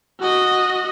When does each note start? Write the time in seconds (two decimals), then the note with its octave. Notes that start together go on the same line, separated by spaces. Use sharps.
0.20 F#4 D#5